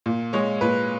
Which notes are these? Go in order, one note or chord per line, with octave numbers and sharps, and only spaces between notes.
A#2
G#3 C#5
A#2 B4